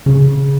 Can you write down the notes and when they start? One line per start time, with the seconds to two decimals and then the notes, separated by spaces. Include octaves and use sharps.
0.06 C#3